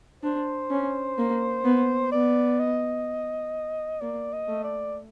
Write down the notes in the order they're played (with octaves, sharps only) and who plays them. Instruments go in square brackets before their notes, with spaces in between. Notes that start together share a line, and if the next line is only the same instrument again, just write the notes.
[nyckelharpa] D4 [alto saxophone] C5
[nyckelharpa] C#4
A#3
B3
[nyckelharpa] B3 [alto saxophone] D5
[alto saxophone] D#5
[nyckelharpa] A#3 [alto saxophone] D5
[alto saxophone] D#5
[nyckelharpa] A3
[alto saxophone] D5